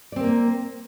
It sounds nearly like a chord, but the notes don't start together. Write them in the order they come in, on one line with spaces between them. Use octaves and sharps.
D5 C4 A#4 A#3